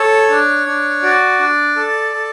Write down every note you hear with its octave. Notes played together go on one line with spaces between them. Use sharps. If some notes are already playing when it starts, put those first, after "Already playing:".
Already playing: A4 C#5
D4
D4
F#4 D5
D4
A4
A4